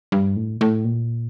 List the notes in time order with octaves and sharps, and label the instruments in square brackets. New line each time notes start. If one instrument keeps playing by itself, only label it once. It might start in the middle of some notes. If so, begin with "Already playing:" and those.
[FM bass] G2
A2
A2
A#2